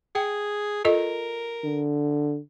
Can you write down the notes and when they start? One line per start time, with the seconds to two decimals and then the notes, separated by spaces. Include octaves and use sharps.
0.15 G#4 G5
0.85 F4 A4 A#4 D#5
1.64 D3